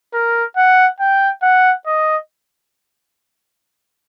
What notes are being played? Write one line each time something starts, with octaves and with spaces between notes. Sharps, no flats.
A#4
F#5
G5
F#5
D#5